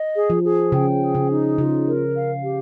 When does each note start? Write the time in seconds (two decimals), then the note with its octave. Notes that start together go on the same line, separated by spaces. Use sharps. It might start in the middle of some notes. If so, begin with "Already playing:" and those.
Already playing: D#5
0.15 G#4
0.30 F3
0.43 G#4
0.72 C#3 G5
1.00 G#4
1.15 C#3
1.30 D#4
1.58 C#3 F4
1.87 A#4
2.15 F5
2.43 G4